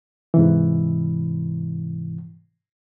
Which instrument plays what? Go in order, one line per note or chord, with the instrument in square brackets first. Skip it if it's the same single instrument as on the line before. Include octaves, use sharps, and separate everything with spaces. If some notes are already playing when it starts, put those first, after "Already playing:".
[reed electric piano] G#2 C3 E3